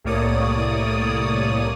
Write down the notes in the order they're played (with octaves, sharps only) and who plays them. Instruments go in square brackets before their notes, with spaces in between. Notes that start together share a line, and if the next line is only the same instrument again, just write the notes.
[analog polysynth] C2 A2 A#3 C#5 D5 D#6